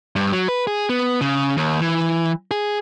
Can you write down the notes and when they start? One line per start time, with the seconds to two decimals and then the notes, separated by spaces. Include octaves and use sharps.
0.16 G2
0.32 F#3
0.48 B4
0.67 G#4
0.89 B3
1.21 C#3
1.57 D#2
1.81 E3
2.51 G#4